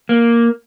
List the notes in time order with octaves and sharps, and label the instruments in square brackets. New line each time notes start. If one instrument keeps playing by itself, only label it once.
[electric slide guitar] A#3